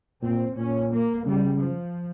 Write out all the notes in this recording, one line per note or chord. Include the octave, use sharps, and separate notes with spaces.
A#2 C4
A#2 C#4
A#3
C#3 G3
F3